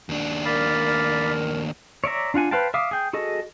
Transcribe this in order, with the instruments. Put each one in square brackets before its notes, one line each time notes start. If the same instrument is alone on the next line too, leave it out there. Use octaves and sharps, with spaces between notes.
[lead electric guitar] D#2 D4
[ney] A#4 [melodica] D5 F5 B5
[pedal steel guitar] C#5 D5 E5 A#5
D4 F4 F#5 G#5
B4 C5 F5 G5 A5
E5 F5 D6 D#6
G#4 G5
F#4 G#4 A4 D#5